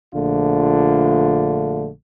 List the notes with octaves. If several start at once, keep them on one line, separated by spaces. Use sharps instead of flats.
A#1 D3 A3 F4